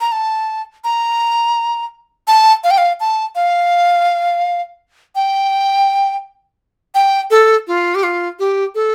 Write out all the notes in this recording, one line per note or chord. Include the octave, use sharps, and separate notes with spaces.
A#5
A5
A#5
A5
F5
G5
F5
A5
F5
G5
G5
A4
F4
G4
F4
G4
A4